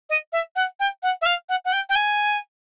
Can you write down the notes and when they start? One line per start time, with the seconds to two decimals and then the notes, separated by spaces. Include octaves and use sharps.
0.09 D#5
0.32 E5
0.56 F#5
0.79 G5
1.03 F#5
1.21 E5
1.25 F5
1.49 F#5
1.65 F#5
1.72 G5
1.89 G5
1.95 G#5